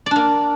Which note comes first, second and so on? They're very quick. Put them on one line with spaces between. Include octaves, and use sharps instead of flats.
D5 D4 A#3